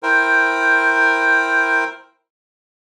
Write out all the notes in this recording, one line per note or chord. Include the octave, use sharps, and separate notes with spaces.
E4 A#4 C5 G5